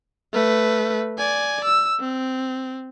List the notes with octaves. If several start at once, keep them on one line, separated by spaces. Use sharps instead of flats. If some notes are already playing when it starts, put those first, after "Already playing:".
A3 B4
D5 G#5
E6
C4